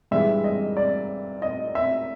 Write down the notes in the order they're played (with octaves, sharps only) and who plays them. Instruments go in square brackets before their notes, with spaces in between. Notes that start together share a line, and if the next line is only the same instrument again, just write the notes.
[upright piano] G2 E3 G#3 E5
D#5
D5
D#5
E5